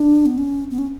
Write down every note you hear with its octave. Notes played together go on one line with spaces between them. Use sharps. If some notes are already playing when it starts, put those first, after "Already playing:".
Already playing: D4
B3
C#4
B3
C#4